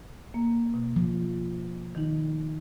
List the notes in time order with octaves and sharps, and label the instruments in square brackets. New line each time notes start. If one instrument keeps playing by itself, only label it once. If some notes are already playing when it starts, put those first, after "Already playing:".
[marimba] A#3
B2
[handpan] F3
[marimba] D#3 D#4